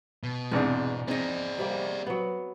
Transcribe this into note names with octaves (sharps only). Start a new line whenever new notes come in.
B2
E2 G#2 C3 C4 D4
C4 D#4 G#4 D5
C3 G3 A#3
F#3 B3